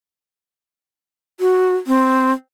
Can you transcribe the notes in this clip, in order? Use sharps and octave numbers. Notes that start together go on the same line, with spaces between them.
F#4
C4